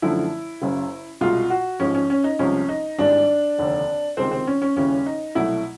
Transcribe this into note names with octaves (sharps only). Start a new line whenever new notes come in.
F#2 D3 F3 A3 E4
F#1 F#2 C#3
C2 B2 G#3 F4
F#4
A1 G#2 F3 G#3 C#4
C#4
C#4
D#4
C2 C3 F3 G#3 C#4
D#4
G#1 G#2 E3 G3 D4
F1 D#2 D3
C#2 C3 D#3 G#3 C4
C4
C#4
C#4
D#2 C#3 E3 G3 C#4
D#4
C2 B2 F#3 A3 E4